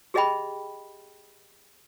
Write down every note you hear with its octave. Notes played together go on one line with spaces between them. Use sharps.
G4 G#4 D#5 E5 G5 B5